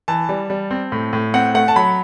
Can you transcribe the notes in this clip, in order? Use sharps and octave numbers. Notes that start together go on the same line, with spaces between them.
E3 A5
G3
G3
C4
A2
A2
C4 F#5
A3 F#5
A5
F#3 B5